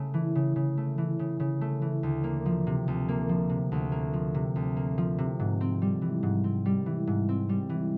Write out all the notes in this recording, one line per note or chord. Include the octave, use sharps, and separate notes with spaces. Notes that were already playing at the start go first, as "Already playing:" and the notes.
Already playing: C#3 A3
E3
C#3
C#3
A3
E3
C#3
C#3
A3
E3
D2
A#3
F3
C3
D2
A#3
F3
C3
D2
A#3
F3
C3
D2
A#3
F3
C3
G#2
C4
G3
E3
G#2
C4
G3
E3
G#2
C4
G3
E3